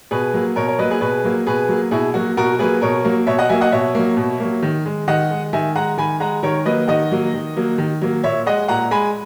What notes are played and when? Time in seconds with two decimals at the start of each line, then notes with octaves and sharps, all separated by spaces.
0.11 B2 G#4 B4
0.34 F#3 A#3
0.56 B2 A#4 C#5
0.68 A#4 C#5
0.79 F#3 B4 D#5
0.83 A#3
0.90 G#4 B4
1.01 B2 G#4 B4
1.24 F#3 A#3
1.47 B2 G#4 B4
1.69 F#3 A#3
1.91 B2 E4 G#4
2.14 F#3 A#3 F#4
2.37 B2 F#4 A#4
2.59 F#3 A#3 G#4 B4
2.81 B2 A#4 C#5
3.05 F#3 A#3
3.27 B2 C#5 E5
3.39 D#5 F#5
3.49 F#3 A#3 E5 G#5
3.61 D#5 F#5
3.72 B2 C#5 E5
3.95 F#3 A#3
4.17 B2
4.40 F#3 A#3
4.63 D#3
4.86 G#3
5.08 D#3 D#5 F#5
5.31 G#3
5.53 D#3 E5 G#5
5.75 G#3 F#5 A#5
5.98 D#3 G#5 B5
6.20 G#3 F#5 A#5
6.43 D#3 A#4 C#5
6.65 F#3 A#3 B4 D#5
6.88 D#3 D#5 F#5
7.11 F#3 A#3
7.34 D#3
7.57 F#3 A#3
7.78 D#3
8.02 F#3 A#3
8.24 A#2 C#5 E5
8.46 G#3 D#5 F#5
8.68 A#2 F#5 A#5
8.91 G#3 G#5 B5